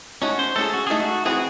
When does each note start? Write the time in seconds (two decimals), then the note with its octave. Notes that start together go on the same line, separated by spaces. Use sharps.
0.22 A3 C#4 D#4 F#4 C#5
0.39 C5
0.56 A3 C#4 G#4 A4
0.74 F#4
0.87 A3 D#4 G#4 A4
1.00 F#4
1.25 E3 C4 F#4 G#4